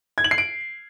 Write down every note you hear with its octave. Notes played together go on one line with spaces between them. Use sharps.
G#6
F#7
C7
D7